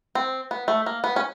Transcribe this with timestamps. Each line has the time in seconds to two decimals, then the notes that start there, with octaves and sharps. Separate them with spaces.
0.15 C4
0.51 B3
0.68 A3
0.86 A#3
1.04 B3
1.16 C#4